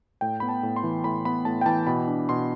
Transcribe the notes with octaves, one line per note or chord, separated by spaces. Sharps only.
A2 G5
B3 B5
A5
A2
C6
E3
A2 B5
B3 B5
A2 A5
G5
E3 A5
B2 B5
D4
B2 C6